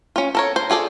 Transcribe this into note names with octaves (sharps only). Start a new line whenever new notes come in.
C#4 F4
A4 A#4 C#5
C5
F4 G#4 A4 D5